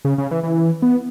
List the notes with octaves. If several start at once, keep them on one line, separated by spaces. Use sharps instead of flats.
C#3
C#3
E3
E3
B3